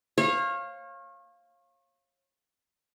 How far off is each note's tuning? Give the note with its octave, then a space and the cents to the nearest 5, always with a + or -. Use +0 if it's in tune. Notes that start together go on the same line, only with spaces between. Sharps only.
C#5 -35 F5 +0